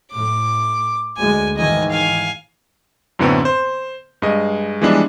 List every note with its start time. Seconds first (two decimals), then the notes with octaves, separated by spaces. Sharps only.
0.12 A2 D6
1.17 D2 G#3 G#5
1.57 G#2 D#3 E3 D#5 G#5
1.90 F5 G#5
3.19 F#2 A2 D3 A3 B3 C4
3.45 C5
4.22 G2 G#3 D#5
4.82 E3 F3 G3 G#3 B3 D4